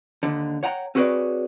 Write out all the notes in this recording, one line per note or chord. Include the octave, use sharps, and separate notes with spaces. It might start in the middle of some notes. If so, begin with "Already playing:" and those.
D#2 D3
C#5 F#5 G5 A#5
C4 F#4 G#4 B4 C#5 D5